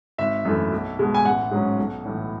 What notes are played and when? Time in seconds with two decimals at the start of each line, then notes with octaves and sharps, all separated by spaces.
0.18 G#1 E5
0.45 F#2 E3 A3
0.72 B1
0.99 B2 G#3
1.14 G#5
1.24 A1 F#5
1.51 G#2 F#3 C#4
1.78 B1
2.05 A2 E3